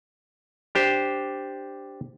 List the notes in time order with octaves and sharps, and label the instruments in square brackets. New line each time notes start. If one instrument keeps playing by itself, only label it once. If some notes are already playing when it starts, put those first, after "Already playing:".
[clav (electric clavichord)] D4 G4 C5